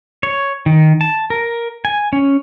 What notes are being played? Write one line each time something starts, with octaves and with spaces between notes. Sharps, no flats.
C#5
D#3
A5
A#4
G#5
C#4